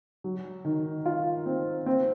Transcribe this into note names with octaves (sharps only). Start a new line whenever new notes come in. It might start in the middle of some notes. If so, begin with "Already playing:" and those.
F#3
D#3
F4
C4
C4